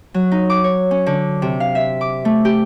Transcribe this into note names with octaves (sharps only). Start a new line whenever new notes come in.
F#3
D#4
D6
C#5
C#4
D3
C3
F5
E5
D6
A3
G4